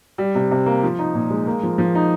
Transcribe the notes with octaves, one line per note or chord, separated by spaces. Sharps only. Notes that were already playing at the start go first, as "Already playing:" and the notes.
G3
C3
C3
A#3
F3
D#4
A#2
G#3
A#3
F3
F3
D#4